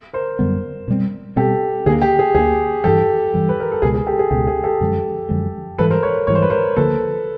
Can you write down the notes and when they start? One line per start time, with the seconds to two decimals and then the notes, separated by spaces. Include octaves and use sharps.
0.13 A#4 C5
0.39 F#2 D3 G3 B3
0.88 B2 G3 C4
1.36 B2 G3 C4 G4 A4
1.86 D2 D3 F#3 A#3 G#4
2.02 G4
2.19 G#4
2.35 D2 D3 F#3 A#3 G#4
2.84 G2 E3 G3 G4 A4
3.34 G2 E3 G3
3.49 B4
3.60 A#4
3.72 A4
3.82 C#2 B2 G#3 G#4
3.94 G#4
4.07 G4 A4
4.19 G#4
4.31 C#2 B2 G#3 G4
4.47 G#4
4.64 G4 A4
4.81 F#2 D3 F3 G#3
5.29 F#2 D3 F3 G#3
5.78 G#2 E3 G3 A4 B4
5.90 A#4 C5
6.03 B4 C#5
6.27 G#2 E3 G3 C#5
6.35 C5
6.42 B4
6.50 A#4 C5
6.76 D2 D3 F3 A#3 A4 B4